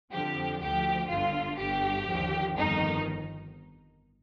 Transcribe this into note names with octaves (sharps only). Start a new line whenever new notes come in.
F2 D3 F3 G4
D2 D3 F3 G4
G1 G2 D3 F4
G1 G2 D3 G4
D#2 D3 F3
G1 F2 D#3 D#4